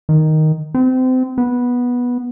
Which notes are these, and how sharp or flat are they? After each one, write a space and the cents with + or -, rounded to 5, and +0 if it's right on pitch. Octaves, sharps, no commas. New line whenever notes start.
D#3 +0
C4 -30
B3 -10